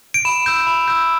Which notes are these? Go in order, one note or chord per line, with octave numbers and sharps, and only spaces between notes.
D7
B5 E7
E6 G6
B5
E6 G6